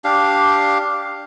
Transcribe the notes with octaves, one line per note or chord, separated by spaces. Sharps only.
D4 G4 F5